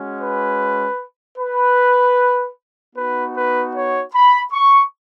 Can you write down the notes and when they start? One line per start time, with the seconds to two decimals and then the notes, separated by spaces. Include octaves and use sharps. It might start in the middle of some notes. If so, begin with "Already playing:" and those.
Already playing: G#3 C#4 F#4
0.20 B4
1.39 B4
2.96 B3 D#4 F#4 B4
3.36 B4
3.75 C#5
4.14 B5
4.53 C#6